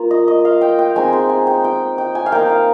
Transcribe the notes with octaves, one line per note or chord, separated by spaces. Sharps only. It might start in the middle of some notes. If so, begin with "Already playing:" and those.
Already playing: A#3 F4
D#5
D#5
F5
G5
G5
G#3 C4 D#4 G#5
G5
G#5
G5
G5
G5
G#5
F5
A#3 D#4 G5
F5